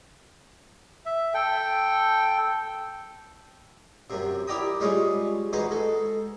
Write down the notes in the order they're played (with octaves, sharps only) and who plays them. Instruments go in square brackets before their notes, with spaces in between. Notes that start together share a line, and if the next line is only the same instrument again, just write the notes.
[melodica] E5
A4 G5
[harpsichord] F#2 C3
E4 G4 D5 G5 A#5 D#6
G3 G#3 C#4 F4 G#4
G#3 D#4 F#4 B4 C5
G#3 A4